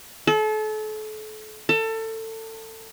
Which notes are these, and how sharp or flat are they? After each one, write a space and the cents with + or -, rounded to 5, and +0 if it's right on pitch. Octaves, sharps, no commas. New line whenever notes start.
A4 -35
A4 +25